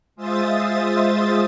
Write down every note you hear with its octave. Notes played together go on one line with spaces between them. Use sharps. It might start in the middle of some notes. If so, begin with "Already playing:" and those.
G#3 F4 C5 E5 D#6 A6